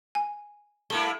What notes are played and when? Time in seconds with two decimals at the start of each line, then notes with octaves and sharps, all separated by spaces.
0.15 G#5
0.90 G3 A3 A#3 E4 G7